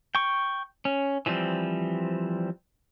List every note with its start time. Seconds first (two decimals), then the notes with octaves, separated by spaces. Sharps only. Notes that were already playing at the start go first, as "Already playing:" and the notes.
0.15 G5 C#6
0.85 C#4
1.26 E3 F3 G3 C4